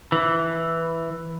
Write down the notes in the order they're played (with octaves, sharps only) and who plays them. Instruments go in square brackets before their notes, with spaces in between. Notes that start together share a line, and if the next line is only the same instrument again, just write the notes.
[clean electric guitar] E3